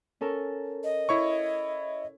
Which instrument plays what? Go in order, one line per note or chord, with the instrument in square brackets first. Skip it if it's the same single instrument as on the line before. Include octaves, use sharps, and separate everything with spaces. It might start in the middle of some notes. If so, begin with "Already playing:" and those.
[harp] C#4 A4 A#4
[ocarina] D#5
[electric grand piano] E4 C#5 C#6